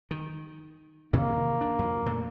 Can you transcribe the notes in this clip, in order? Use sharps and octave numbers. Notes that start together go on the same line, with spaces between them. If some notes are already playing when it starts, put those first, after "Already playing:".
D#3
C3 D#3 E3 A#3
D4
F2
A#2 A3